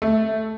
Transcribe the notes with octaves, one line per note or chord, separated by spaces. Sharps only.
A3